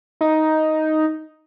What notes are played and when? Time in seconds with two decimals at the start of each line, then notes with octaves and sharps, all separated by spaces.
0.21 D#4